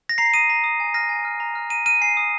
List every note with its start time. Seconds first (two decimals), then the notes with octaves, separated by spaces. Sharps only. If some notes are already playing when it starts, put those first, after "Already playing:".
0.09 A#6
0.18 A#5 C7
0.34 D#6 D#7
0.49 A#5
0.64 D#6
0.80 G#5
0.94 F6 A#6
1.09 G#5
1.25 F6
1.40 A#5
1.55 F6
1.70 A#5 D#7
1.86 F6 D#7
2.01 G#5 C7
2.17 D#6